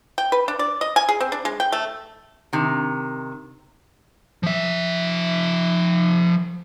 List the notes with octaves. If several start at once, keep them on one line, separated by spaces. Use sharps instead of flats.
G5
B4
D4
D5
D#5
G#5
G#4
C4
D4
G#3
G5
A3
C3 D#3
F3 E5